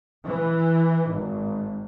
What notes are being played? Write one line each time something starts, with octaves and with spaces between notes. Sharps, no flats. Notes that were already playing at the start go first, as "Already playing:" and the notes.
E3
G#1